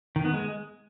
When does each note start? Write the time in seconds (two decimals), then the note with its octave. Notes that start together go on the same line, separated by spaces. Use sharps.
0.16 D#3
0.25 B3
0.34 G#3